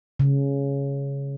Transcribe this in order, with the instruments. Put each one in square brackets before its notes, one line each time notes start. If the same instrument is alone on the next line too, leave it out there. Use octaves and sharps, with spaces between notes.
[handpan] C#3